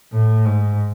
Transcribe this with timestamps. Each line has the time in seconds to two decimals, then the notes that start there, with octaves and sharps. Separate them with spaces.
0.12 A2
0.45 G#2